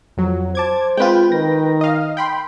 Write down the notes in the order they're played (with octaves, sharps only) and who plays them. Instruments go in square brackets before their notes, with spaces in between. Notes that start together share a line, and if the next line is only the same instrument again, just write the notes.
[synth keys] F2 F#3
[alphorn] C5 [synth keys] A5 D6 G#6
[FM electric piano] G#3 C4 F4 [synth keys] B4 G5
[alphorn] D#3 [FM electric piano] A#6
[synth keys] D#5 F5
G5 B5 C6